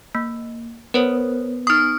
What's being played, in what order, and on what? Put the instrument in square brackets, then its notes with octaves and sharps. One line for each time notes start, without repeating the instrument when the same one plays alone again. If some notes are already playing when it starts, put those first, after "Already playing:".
[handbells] A#3
[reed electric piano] B3 [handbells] A#4 C5 C#5
[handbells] D#4 C#6 [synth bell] D#6 F6